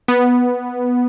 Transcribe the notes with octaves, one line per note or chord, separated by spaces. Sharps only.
B3